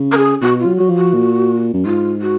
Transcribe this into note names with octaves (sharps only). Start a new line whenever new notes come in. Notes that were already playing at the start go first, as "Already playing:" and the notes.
Already playing: C#3
A#4
G#4
B2 F#4
F4
F#3
F#3 F#4
F3
F#4
A#2
F#2
G#2 F4
F#4